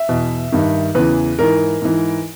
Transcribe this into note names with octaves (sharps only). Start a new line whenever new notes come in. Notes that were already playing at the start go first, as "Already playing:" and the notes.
Already playing: E5
E2 B2
G2 D#3
E2 C#3 E3 B4
G#2 E3 A#4
G#2 E3